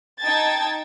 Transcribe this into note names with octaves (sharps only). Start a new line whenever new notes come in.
D#4 G5 A5 G#6 A6